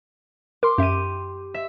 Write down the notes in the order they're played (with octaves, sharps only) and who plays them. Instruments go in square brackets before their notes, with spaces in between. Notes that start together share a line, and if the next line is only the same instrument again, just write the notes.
[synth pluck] A#4 [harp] C6 D6
[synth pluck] F#2 E5 [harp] G4 D#7
[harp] E5